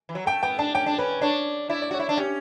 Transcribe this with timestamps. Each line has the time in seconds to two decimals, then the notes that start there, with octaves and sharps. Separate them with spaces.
0.09 E3
0.15 F#3
0.26 A3 G5
0.43 B3 G5
0.59 D4 A5
0.75 C#4 G5
0.86 D4
0.98 C#4 B4
1.22 D4 C#5
1.69 E4 D5
1.82 D5
1.91 F#4 C#5
2.00 E4
2.09 D4
2.17 C#4 G4